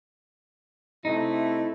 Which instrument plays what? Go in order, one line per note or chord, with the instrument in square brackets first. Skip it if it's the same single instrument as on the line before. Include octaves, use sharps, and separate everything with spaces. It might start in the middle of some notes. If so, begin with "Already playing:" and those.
[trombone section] C3 A3 E4 [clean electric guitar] D#4